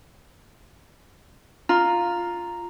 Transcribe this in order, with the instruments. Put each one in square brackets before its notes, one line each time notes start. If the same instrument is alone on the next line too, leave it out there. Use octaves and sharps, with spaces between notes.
[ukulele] F4 [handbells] A#5